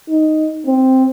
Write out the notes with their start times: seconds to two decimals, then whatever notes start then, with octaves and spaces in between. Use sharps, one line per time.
0.09 D#4
0.66 C4